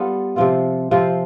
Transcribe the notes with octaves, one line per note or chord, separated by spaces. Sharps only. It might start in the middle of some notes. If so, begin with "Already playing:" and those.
Already playing: G3 B3 F4 A4
C3 F3 C4 F4
C3 F3 C4 F4